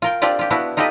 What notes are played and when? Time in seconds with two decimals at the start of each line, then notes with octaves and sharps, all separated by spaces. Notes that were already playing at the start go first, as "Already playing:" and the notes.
0.02 F4 A#4 G5
0.22 C4 D4 F4 G4 D5
0.39 F4 G4
0.50 B3 D4 E4 F#4
0.77 D#4 F4 G4 A4 B4 D#5